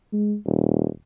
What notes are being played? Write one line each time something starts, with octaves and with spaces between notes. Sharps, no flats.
G#3
D#1